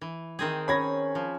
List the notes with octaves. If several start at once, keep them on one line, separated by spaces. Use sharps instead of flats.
E3
D#3 C4 G#4
C#4 C#5 B5 G#6 A#6
F3